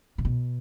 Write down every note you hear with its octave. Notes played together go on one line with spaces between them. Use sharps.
C3
B2